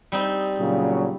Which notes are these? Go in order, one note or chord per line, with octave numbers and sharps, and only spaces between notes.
G3 C4 D#4
A#2 C#3 F#3